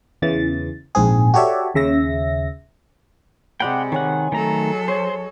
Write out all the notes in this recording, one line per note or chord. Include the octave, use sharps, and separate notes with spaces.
E2 C#3 E3 A6
A#1 G#2 C4 G#4
F#4 G4 A4 C#5 D5 E5
D#2 C#3 E5 A#6
C3 G#3 G4 D5 F#5 G5 B5
D#3 C#5 F#5 G#5
D#3 F#3 A3 A4 A#5
C5 C#5